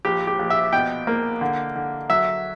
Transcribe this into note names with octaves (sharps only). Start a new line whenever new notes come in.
A#1 G4
G4
A#1
E5
B2 G5
A#3
D3
D3
F#3 E5